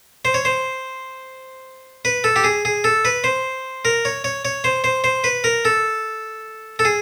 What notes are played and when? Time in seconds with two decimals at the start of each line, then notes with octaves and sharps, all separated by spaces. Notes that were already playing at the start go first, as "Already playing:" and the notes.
0.25 C5
0.34 C#5
0.45 C5
2.05 B4
2.24 A4
2.36 G4
2.44 G#4
2.65 G#4
2.84 A4
3.05 B4
3.24 C5
3.85 A#4
4.05 C#5
4.24 C#5
4.45 C#5
4.64 C5
4.84 C5
5.04 C5
5.24 B4
5.44 A#4
5.65 A4
6.79 A4
6.85 G#4